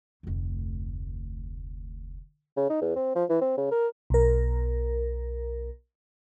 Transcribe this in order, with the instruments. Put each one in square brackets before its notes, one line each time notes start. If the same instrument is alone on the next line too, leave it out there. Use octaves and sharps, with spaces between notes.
[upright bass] F1 D2
[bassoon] C#3
D#4
E2
C4
F3
E3
C4
C#3
A#4
[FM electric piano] B1 A#4